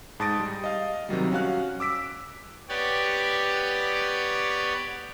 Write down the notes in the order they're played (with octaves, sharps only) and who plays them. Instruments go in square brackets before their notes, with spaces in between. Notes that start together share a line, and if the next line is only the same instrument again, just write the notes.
[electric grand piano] G#2 A5 D#6 A6 A#6 D7
G3
D#5 F5
C3 D#3 F#3 G3
C#4 F#4 F5 F#6
D6 E6 B6 D7
[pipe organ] B3 G4 C#5 D5